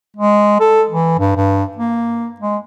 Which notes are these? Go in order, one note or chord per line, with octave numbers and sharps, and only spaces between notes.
G#3
A4
E3
G2
G2
A#3
G#3